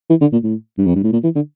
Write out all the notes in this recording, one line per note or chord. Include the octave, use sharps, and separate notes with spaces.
E3
D3
A#2
A2
G2
F2
G2
A2
A#2
E3
D3